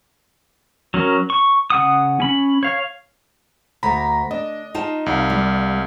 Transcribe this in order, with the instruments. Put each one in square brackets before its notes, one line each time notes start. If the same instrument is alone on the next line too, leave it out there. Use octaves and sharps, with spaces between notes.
[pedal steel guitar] F#3 C#4 A#4
C#6
C#3 F#5 D#6
C#4 B5
C#5 F5
[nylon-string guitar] D2 [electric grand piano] A#5 B5
[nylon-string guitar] D4 [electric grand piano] D#5
[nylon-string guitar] D#4 F4 A5
[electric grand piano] C2 F5
[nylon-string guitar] G3